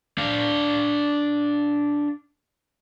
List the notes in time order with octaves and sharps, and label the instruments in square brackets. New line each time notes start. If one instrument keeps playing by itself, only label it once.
[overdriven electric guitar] D4 F5